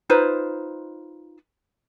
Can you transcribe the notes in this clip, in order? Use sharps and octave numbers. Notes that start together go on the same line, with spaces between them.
D#4 F4 B4 C5